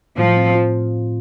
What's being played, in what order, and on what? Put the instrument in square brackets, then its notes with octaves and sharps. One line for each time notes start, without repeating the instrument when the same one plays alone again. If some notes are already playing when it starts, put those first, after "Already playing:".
[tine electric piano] A2 [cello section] F3
[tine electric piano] C4
F4